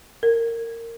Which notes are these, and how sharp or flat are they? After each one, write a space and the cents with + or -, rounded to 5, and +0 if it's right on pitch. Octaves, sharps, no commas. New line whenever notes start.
A#4 -20